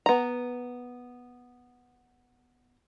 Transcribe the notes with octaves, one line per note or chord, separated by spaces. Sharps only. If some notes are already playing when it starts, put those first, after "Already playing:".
B3 A#5